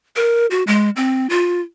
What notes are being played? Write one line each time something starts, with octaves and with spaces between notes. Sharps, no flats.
A#4
F#4
G#3
C4
F4